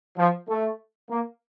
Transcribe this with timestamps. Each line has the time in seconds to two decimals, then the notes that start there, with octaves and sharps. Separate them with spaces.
0.18 F3
0.48 A3
1.10 A#3